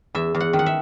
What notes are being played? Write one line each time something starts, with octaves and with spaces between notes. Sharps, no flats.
E2 E5
E2
F#5
D#3
F#5
E5